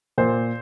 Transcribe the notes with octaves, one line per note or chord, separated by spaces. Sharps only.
A#2 C5